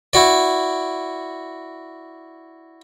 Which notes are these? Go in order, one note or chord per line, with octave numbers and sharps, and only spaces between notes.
E4 F#4 D5